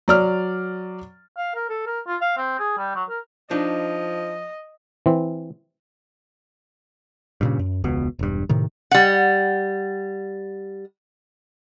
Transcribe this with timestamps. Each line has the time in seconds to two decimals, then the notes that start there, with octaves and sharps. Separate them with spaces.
0.08 F#3 D5 F6
1.37 F5
1.55 A#4
1.69 A4
1.86 A#4
2.06 F4
2.21 F5
2.37 C4
2.59 G#4
2.78 G3
2.95 F#3
3.09 A#4
3.51 F3 D4 D#4 D#5
5.06 E3 C4
7.41 G2 A#2 C#3
7.59 F#2
7.84 E1 C#2 B2 B3
8.19 E1 G2
8.49 A2 C3 D#3
8.91 G3 F#5